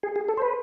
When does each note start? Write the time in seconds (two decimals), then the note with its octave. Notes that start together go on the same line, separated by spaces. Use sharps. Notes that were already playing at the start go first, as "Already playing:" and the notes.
0.03 G#4
0.16 G#4
0.28 A4
0.37 C5
0.42 B4